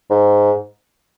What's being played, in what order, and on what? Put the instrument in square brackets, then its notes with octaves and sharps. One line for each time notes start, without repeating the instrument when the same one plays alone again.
[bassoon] G#2